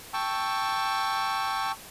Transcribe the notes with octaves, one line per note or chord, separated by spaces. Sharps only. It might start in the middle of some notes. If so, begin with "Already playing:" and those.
G5 A5 C#6 E6